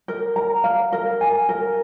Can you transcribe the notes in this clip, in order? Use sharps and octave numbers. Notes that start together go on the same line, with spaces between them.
A#4
A#5
F5
A#4
G#5
A#4